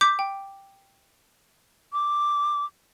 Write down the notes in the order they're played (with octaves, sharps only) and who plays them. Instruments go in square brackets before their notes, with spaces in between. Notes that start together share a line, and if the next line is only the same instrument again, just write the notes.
[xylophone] D6 G6 B6
G5
[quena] D6